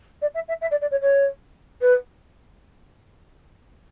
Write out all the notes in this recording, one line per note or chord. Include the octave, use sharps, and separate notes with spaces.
D5
E5
E5
E5
D5
D5
C#5
C#5
B4